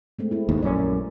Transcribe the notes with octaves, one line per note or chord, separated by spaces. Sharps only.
G#3 A3 C4
C4 E4
D#2 G#2
A#1 F#2 C#4 D5